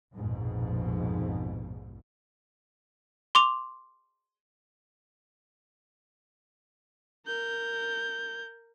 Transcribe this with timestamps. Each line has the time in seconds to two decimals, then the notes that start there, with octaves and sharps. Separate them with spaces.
0.13 A#1 F2 G#2 B2
3.35 C6 D6 F7
7.27 A#4 G6